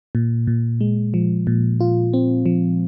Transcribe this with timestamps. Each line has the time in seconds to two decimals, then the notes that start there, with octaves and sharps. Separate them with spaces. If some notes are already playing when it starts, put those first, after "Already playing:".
0.15 A#2
0.47 A#2
0.81 G#3
1.14 F3
1.47 A#2
1.80 F4
2.13 C4
2.46 F3